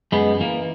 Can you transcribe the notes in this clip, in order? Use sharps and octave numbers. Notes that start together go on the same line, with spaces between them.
F#2 G#3 B3
E3 A#3